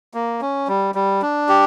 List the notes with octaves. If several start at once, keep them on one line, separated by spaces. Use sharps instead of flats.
A#3
C#4
G3
G3
D4
G4